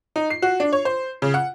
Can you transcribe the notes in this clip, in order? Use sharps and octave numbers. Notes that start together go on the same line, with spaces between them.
D#4
C7
F#4
D4
C#5
C5
C#3
F#5